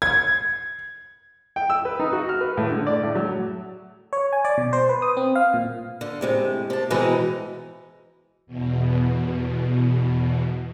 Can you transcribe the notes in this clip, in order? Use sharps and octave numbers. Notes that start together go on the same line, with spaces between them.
G#6
G5
E6
B4
D#4
F#4
F6
B4
A2
D3
D5
A2
F#3
C#5
G#5
D5
B2
C5
B4
D#6
C4
F5
A#2
D3
A2 C3 G#3
C3 A5
B2 E3 G#3 B3 C4 D#4
E2 B2